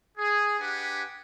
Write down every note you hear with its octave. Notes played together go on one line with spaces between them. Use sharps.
G#4
D4 G4 B4 F#5 G#5